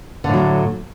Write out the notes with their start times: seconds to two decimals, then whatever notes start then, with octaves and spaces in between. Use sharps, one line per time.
0.24 D3
0.29 A2
0.33 F#3